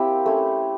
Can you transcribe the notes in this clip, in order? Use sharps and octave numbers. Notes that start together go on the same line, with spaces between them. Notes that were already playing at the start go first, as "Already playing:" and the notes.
Already playing: A#3 C4 E4 G4
A3 C#4 E4